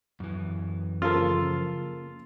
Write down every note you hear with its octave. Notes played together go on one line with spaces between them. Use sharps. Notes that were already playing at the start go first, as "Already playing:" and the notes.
F#2 E3
C#3 F3 A#3 F4 A4